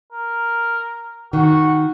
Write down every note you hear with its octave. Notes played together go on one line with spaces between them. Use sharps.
A#4
D#3 F#4